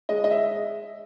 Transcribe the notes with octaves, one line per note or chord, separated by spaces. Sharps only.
G#3 D#5
D#5
E5